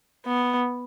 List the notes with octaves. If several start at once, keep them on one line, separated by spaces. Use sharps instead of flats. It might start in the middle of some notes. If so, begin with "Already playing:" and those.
B3